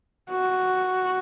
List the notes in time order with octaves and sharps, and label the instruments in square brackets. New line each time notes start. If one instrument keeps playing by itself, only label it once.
[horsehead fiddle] F#4